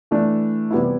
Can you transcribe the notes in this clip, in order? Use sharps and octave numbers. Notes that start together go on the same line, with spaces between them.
E3 A3 D4
C3 E3 G3 B3 E4